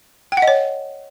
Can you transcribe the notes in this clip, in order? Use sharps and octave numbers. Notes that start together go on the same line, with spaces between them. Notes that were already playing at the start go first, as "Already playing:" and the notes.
G5
F#5
D#5
C#5